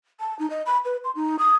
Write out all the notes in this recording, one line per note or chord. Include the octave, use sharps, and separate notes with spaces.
A5
D#4
D#5
B5
B4
C6
D#4
D#6